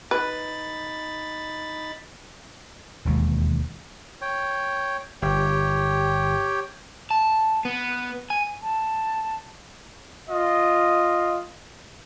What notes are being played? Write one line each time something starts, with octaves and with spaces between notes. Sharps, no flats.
D#4 B4 B5 A6
E1 D#2 G#3
C#5 G5
G1 G4 C#5 G5
A5
B3
G#5
A5
F4 D#5